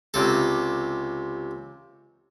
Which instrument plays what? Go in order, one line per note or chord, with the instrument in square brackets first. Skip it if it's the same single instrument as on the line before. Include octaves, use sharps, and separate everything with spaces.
[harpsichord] C#2 C3 A4